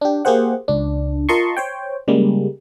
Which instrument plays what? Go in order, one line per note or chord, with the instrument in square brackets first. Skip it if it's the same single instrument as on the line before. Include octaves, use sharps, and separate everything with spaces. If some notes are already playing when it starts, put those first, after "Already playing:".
[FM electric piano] D4 G4
A#3 G4 G#4 C5 F#5
C#2 D4
F4 A#4 D#5 A5 C6 C#6
C5 C#5 G5
C#3 G3 G#3 A#3